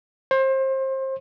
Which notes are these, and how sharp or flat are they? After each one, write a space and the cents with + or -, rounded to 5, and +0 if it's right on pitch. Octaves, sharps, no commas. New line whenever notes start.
C5 +30